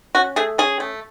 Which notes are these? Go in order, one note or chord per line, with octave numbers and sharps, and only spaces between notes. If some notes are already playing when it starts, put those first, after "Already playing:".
C#4 F#4
A3 G#4
C#4 G#4
A3